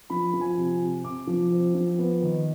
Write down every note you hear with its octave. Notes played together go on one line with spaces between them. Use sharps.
F3 B5
F3
G#5
C3
C3
C3 D6
F3
C4
F3
B3
D#3